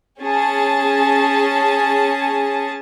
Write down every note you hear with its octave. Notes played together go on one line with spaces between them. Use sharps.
C#4 G#4 A5